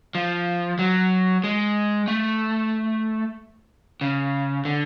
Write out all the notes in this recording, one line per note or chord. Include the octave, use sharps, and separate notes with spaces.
F3
F#3
G#3
A3
C#3
D3